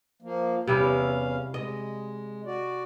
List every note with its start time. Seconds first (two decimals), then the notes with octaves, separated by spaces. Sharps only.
0.22 F3 A#3
0.67 E2 C3 G3 C#4 E4 F5
1.54 G#3 D#5
2.46 F#4 D5